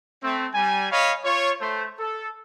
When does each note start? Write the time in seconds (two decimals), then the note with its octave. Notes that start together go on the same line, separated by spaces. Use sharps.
0.24 A3 C4
0.55 G3 G#5
0.92 C#5 D#5 F5 B5
1.24 F4 C#5
1.61 A3 C5
2.00 A4